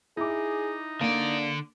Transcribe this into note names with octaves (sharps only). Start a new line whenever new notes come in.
D#4 E4 G#4 D6
D3 A#3 D4 D5